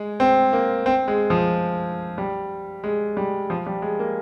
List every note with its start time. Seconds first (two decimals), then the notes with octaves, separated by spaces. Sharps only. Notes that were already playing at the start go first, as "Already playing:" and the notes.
Already playing: G#3
0.20 C4
0.53 A#3
0.86 C4
1.08 G#3
1.30 F3
2.18 G3
2.84 G#3
3.17 G3
3.50 F3
3.66 G3
3.82 G#3
3.99 A#3